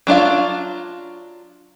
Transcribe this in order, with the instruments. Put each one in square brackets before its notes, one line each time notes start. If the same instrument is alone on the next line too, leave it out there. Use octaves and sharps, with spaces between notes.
[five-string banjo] F#3 D4 F4 F5